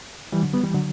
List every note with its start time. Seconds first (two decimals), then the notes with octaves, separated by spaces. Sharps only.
0.32 E3 G3
0.43 D3 F#3
0.53 G3 B3
0.63 E3 G3
0.74 D3 F#3